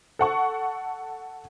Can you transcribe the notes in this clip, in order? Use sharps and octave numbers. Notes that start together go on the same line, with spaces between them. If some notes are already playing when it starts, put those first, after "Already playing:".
A4 F#5 C#6